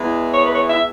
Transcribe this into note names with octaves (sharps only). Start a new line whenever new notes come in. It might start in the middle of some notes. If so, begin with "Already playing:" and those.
Already playing: E2 E3 G#3
C#5
B4
C#5
E5